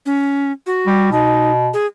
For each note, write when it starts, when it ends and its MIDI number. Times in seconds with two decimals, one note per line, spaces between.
0.06 0.52 61
0.67 1.10 66
0.86 1.09 55
1.12 1.70 47
1.12 1.51 63
1.74 1.86 68